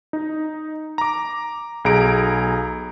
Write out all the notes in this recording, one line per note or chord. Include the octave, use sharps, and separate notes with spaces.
D#4
A#5 D6
B1 G#4 A#5 D7